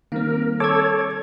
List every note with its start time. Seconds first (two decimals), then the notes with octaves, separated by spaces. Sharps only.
0.12 D#3 G3 A#3 C4 A#4
0.60 A4 C#5 D6 E6 G#6